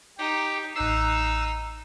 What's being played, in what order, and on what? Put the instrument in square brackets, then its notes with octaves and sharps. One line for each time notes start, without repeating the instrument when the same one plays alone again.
[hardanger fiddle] D#4 [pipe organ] G4
[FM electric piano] A1 F#6 C7 [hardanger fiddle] D#4 [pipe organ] E6